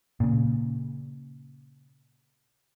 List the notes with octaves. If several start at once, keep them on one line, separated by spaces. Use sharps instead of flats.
A#2 C#3